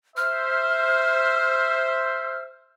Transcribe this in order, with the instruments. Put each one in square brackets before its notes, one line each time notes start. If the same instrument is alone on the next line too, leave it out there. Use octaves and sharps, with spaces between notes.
[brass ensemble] C5 E5 [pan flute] F6